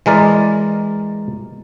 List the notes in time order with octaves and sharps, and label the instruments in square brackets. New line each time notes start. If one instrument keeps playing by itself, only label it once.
[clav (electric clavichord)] E3 G#3 A#4 D5